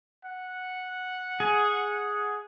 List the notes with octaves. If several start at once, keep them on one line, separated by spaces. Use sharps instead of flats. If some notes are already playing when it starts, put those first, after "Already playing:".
F#5
G#4